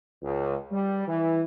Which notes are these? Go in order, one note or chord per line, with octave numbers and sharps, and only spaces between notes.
C#2
G3
E3